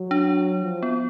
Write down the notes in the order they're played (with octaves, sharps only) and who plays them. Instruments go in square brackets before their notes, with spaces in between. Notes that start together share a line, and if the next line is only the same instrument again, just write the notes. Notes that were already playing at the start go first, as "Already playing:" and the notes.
Already playing: [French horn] F#3
[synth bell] D4
[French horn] F3
[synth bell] B3